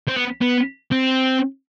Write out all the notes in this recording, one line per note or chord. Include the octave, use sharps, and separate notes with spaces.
C4
B3
B3
C4